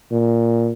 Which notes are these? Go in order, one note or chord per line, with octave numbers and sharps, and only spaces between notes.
A#2